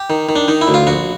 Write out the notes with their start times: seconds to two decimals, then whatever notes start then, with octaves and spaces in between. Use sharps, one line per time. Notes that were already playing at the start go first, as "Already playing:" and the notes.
Already playing: G4
0.10 D#3
0.29 D#3
0.36 D4
0.48 D#3 D#4
0.61 E4
0.68 D2
0.74 F4
0.87 A#1 F#4